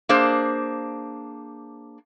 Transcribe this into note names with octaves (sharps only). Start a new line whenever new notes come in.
A#3 D4 G#4 C5